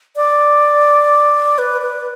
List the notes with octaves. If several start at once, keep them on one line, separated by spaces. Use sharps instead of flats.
D5
B4
B4